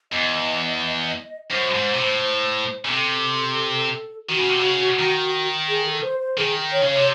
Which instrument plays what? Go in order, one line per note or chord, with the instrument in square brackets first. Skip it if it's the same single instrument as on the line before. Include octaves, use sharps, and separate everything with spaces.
[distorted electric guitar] E2 [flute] D#5
[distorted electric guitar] F#2 [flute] C5
[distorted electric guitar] G#2
C3
A2
C#3
[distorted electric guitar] C3 [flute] A4
[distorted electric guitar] D#3 [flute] F#4
[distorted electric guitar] C#3
C3
C#3
D#3
[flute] G#4
A4
C5
C5
[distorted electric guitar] D#3 [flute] G#4
[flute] C#5
[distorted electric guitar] C#3
[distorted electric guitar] C3 [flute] C#5